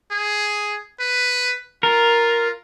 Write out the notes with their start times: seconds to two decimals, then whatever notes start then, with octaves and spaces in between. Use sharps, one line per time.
0.12 G#4
1.00 B4
1.83 F4 A#4